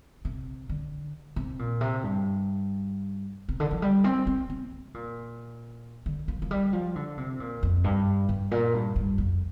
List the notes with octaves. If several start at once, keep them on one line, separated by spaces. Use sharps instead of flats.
C3
D3
C3
A#2
C3
G2
C3
D3
F3
G3
C4
C4
C4
C3
A#2
D3
F3
F3
G3
F3
D3
C3
A#2
F2
G2
G2
A#2
G2
G2
F2